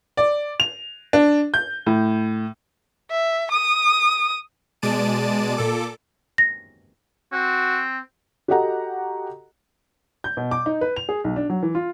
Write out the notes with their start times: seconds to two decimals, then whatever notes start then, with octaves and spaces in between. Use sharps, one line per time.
0.17 D5
0.60 F7
1.13 D4
1.54 G6
1.86 A2
3.11 E5
3.51 D#6
4.82 B2 G#3 D5 A5 D7 D#7
5.57 A#2 A4 D6
6.38 A#6
7.33 C4 F#4
8.48 F#4 G4 A4 D#5 F#5 A#5
10.24 G6
10.37 B2
10.51 D6
10.66 D#4
10.81 B4
10.96 F7
11.09 G#4
11.24 B1
11.36 D4
11.50 F#3
11.63 E3
11.75 F4